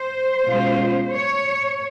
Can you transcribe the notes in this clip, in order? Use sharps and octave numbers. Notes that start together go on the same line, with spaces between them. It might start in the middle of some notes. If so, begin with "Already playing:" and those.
Already playing: C5
B2 G#3 C#4 F4
C#5